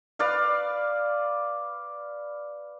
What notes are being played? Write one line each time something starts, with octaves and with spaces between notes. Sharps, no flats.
B4 D5 F5